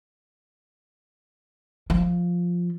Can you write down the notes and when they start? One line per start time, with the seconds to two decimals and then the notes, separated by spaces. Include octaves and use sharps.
1.90 F3